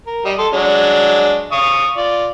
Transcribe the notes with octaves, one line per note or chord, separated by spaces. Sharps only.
A#4
G3 D#5
A4 C6
F#3 G#3 D4
F5 C#6 D#6
F4 D5